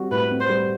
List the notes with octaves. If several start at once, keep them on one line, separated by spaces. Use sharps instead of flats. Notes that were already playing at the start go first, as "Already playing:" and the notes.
Already playing: G3 C4 F#4
A2 B4
C4
C5
G3